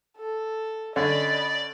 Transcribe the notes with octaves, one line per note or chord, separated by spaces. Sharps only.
A4
D3 C#4 D5 D#5 B5